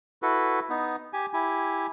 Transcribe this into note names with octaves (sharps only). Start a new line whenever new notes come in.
E4 F#4 A4 B4
B3 D#4
G4 G#5
E4 G4 G#5